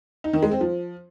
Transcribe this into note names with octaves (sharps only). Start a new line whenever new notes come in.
D#4
D#3
G#3
C4
F3